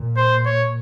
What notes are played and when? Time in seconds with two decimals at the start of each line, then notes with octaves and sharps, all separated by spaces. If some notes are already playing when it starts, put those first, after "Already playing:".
Already playing: A#2
0.17 C5
0.46 C#5